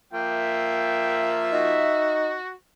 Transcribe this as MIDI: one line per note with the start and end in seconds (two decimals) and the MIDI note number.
0.13 1.89 53
0.13 1.89 58
0.13 2.18 76
0.13 1.37 79
1.53 2.35 63
1.53 2.52 66